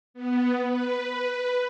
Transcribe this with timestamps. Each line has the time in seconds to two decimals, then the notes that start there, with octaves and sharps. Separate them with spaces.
0.14 B3
0.64 B4